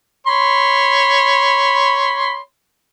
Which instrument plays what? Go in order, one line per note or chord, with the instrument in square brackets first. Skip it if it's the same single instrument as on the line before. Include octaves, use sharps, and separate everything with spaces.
[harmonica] C#5 B5 C6